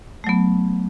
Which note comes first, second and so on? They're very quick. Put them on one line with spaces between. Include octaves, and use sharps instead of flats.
A3 F#3 B3